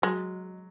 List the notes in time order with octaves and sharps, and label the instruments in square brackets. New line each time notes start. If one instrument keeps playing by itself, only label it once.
[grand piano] F#3 [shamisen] G#3